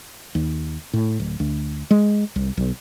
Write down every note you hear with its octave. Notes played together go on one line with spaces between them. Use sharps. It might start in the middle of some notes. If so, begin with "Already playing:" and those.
D#2
A2
D1
D2
G#3
C2
B1